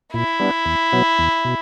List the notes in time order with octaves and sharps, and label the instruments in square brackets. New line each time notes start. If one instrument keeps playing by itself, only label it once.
[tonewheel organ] A#2 [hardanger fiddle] E4
[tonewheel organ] G3 B3 D4
E2
B2 F#3 B3
E2
B2